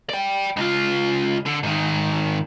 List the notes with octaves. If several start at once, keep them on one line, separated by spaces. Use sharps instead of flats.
D5 G5
C#2 F4
D3
G#2 D#3